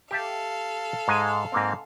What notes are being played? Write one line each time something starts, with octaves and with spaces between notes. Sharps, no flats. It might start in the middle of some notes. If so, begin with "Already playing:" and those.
G4 A4 E5 F5 A5
G#2 G#3 G#5
G#2 A#3 C4